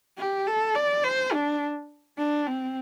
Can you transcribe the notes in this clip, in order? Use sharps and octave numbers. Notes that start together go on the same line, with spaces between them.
G4
A4
D5
C5
D4
D4
C4